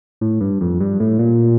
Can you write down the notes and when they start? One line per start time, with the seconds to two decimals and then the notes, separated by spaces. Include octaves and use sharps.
0.21 A2
0.41 G2
0.61 F2
0.80 G2
1.00 A2
1.19 A#2